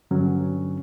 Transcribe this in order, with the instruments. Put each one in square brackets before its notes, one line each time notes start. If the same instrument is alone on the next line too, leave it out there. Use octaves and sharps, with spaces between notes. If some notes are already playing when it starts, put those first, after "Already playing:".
[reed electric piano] G2 D3 F#3 C#4